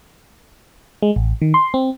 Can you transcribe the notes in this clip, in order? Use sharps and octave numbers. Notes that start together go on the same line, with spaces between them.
G#3
A1
D#3
C6
C4